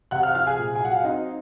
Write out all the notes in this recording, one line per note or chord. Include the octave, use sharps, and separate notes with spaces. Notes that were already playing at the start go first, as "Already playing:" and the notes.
C3 F#5 F#6
F5 F6
F3 F5 F6
G#4 G#5
A#2
G#5
F#3 F#5
F5
C4 D#4 D#5